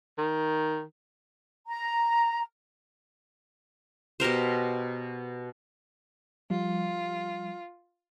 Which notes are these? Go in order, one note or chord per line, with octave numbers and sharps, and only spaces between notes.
D#3
A#5
B2 G4 A#4 C5
F3 G3 F4